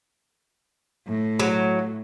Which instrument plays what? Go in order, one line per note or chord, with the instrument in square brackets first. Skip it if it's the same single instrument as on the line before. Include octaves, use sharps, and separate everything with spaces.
[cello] A2
[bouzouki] F#3